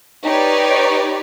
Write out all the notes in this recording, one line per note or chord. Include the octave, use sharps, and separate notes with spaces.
D#4 G4 B4 C#5 D5